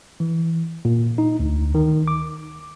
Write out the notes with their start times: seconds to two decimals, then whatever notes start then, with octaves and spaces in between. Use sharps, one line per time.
0.20 E3
0.85 A#2
1.18 D#4
1.40 D2
1.75 D#3
2.08 D6